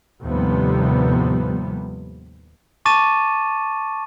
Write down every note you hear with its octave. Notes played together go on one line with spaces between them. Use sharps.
D#2 A2 C3 F3 G3 B3
A5 C#6 D6 A6 D#7 E7